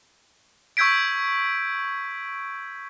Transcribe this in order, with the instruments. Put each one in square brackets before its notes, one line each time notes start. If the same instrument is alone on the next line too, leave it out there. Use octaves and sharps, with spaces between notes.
[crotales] C#6 E6 G6 G#6 B6 D7